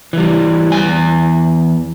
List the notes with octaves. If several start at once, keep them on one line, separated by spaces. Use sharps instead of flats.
E3 G3
E2 G#2 G#5